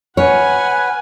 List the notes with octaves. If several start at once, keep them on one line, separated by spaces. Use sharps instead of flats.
B4 C#5 F#5 G#5 F6